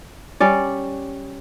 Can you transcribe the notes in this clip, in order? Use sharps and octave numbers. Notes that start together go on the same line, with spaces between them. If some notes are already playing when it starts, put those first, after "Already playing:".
G3 C#4 D5